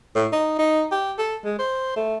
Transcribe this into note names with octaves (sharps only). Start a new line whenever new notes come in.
A2
D#4
D#4
G4
A4
G#3
C5
A3